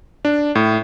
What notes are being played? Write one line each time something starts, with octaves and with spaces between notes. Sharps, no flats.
D4
A2